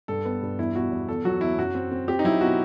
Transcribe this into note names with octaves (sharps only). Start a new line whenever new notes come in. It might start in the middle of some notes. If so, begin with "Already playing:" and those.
G2 A4
B3
G2
E2 E4
B2 F#4
E2
E2 A4
F#3 F#4
E2 E4
F#2 F#4
C4
C4
C4 G4
D#4
F#3 E4
B2 F#4